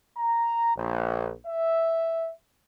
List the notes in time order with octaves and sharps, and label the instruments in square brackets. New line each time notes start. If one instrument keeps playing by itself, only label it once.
[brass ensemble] A#5
A#1
E5